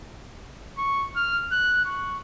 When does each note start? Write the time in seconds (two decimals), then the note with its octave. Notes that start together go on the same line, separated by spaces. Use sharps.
0.77 C#6
1.16 F6
1.52 F#6
1.85 C#6